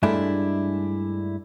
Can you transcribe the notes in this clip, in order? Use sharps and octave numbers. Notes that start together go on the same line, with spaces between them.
G2 G#3 A3 D4 E4